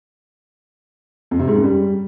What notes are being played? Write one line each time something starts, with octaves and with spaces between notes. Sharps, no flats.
F2
C3
G#2
F#2
G3